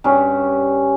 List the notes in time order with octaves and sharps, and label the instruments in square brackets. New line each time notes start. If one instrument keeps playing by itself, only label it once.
[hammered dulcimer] G2 G3 C#4